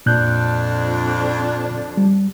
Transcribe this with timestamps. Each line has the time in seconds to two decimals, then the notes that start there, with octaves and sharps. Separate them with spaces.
0.06 F2 A#2 D4 F#6 G6
1.97 G3